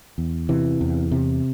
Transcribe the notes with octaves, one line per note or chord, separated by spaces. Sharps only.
E2
C3 E3
E2
C3